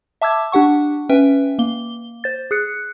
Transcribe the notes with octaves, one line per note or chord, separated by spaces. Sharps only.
E5 A5 D6 E6 G#6
D4 G4 F#5 C#6
C#4 B4 E5 G5
A#3 G7
C5 A6
G#4 F#6 C#7